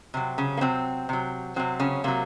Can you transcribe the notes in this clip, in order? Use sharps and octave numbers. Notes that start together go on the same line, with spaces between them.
C3 F#3 C4
C#3 C#4
A#3
C3 F#3 C4
C3 F#3
C3 F#3 C4
C#3 C#4
C3 F#3 A#3